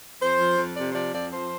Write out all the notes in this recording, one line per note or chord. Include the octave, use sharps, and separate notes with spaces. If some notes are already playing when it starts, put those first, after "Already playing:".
F2 C5
F3
F2
C3 D5
C5
F3 D5
F2 D5
F3 C5